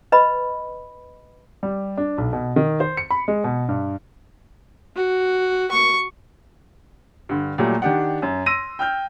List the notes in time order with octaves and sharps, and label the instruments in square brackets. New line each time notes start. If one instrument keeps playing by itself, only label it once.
[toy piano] B4 D#5 B5
[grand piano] G3
D4
B1
B2
D#3
C5
C#7
B5
G#3
B2
G2
[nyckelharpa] F#4
C#6
[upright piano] G2 D3
A#2 F#3 G3 A3
D#3 D4 G4 D5 F#5
F#2
C6 E6 A#6 D#7
G5 F6 G6